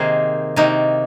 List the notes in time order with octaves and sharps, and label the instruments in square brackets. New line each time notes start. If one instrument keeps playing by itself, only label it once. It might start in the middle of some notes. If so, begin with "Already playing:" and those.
Already playing: [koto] C3 D#3 A#3 D#4 G#4 A#4 C5
C3 D#3 A#3 D#4